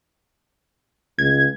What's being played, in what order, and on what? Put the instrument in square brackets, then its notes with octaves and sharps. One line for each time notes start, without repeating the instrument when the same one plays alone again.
[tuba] C#2 [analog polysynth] G#6